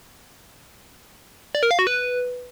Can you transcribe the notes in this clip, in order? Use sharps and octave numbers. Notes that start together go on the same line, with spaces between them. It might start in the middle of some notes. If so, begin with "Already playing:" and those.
D5
A#4
F5
F#4
B4